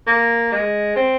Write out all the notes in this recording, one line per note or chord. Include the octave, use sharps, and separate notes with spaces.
A#3
G#3
C4